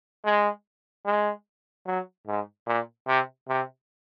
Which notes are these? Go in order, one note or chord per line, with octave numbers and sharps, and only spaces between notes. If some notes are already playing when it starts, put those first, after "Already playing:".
G#3
G#3
F#3
G#2
A#2
C3
C3